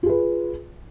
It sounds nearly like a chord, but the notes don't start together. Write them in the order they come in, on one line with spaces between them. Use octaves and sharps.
F4 G#4 B4